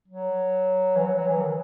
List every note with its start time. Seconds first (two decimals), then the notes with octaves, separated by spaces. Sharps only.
0.08 F#3
0.97 E3
1.03 F#3
1.16 F#3
1.28 E3
1.40 D#3